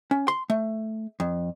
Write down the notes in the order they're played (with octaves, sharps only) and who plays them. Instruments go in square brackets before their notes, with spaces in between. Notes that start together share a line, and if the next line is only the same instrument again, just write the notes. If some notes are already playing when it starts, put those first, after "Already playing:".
[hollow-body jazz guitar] C#4
C6
A3
F2